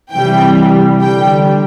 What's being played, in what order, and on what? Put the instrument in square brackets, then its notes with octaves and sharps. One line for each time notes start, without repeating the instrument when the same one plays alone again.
[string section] C3 E3 G3 G5
D3 G3 G5